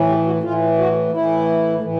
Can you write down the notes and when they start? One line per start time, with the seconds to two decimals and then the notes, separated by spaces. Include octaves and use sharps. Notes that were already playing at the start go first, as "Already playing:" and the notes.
Already playing: A2 E3
0.09 G4
0.26 F#4
0.43 A2 E3 F4
0.78 F#4
1.12 A2 E3 E4
1.81 A2 E3